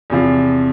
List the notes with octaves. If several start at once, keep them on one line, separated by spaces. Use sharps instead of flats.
E2 C3 F3